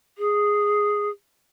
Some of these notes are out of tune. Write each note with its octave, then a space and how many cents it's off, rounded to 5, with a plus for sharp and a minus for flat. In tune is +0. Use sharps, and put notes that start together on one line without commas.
G#4 -5